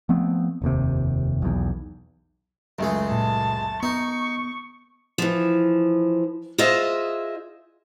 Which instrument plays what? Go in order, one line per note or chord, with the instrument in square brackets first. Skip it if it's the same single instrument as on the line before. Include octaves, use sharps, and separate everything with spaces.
[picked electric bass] F3 A3 B3 C4
F1 D#2 C3
B1 E2
[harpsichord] C#2 G#3 [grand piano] F#2 A3
[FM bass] A#2 [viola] A5
[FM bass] B3 [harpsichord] D#4 [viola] C#6
[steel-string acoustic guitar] E3 F3
F4 G#4 C5 D#5 E5